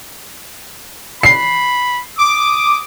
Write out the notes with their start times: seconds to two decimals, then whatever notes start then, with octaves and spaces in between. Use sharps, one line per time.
1.23 B5 C7
2.18 D6 D#6